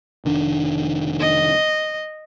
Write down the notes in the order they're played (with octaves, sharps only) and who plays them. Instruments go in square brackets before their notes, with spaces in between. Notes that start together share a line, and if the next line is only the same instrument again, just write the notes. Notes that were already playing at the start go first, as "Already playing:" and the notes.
[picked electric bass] F1 D#3 D4
[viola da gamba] D#5